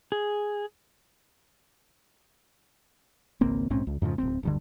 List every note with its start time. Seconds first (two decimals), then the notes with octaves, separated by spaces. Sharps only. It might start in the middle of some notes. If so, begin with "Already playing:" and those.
0.12 G#4
3.41 G#1 C#2 A#3 C4
3.70 A#1 G#2 C4 C#4
3.87 C#2
4.02 F2 G#2 C#3 F3
4.18 D1 G1 C4
4.43 D1 G2 D3